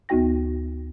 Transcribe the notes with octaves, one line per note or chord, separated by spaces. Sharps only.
D2 B3 D#4 F#4 G5 A#6